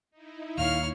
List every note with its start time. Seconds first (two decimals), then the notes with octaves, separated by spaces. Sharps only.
0.11 D#4 E4
0.58 D#2 A#2 C#5 F5 F6